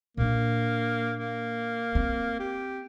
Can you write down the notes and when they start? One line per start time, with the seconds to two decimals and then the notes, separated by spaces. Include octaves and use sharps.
0.17 A#2 A#3 D4
1.18 A#3
1.95 C4
2.40 G4